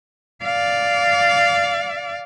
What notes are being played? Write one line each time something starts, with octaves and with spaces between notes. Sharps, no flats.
D5 F5